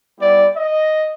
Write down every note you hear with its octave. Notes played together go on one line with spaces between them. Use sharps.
G3 B3 E4 G4 D5
D#5